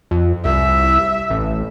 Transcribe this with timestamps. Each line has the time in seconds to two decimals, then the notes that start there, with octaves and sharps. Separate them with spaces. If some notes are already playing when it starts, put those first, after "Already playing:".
0.11 F2
0.45 C2 E5
1.30 A1